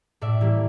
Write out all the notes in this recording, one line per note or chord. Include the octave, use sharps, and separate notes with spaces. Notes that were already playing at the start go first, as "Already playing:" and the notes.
A2 D5 E5
E3 G3 A#3